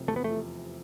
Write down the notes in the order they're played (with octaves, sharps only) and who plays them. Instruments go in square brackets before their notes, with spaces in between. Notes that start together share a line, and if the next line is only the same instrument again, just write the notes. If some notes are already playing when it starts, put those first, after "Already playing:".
Already playing: [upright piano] F1 C3 F3
[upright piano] E2 [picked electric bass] A3
[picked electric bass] B3
[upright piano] F3 [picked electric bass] A3